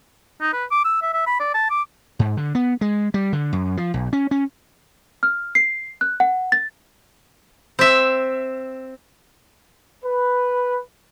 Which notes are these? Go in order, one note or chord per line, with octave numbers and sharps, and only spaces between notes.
D#4
B4
D6
E6
E5
E5
B5
D5
A5
D6
G#2
D3
B3
G#3
G3
D3
F#2
F3
B1
C#4
C#4
F6
C7
F#6
F#5
A6
C4 E5
B4